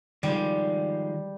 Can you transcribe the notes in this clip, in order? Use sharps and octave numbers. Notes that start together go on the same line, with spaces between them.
D#3 F3 G3 G#3